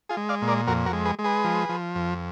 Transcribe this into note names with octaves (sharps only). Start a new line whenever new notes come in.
F4 G#4
G#3
D5 F5
A#2
A#4 D5
F2 F#4 A#4
F#4 A#4
G#3
G#4 B4
G#3
G#4 B4
F3
F3
F2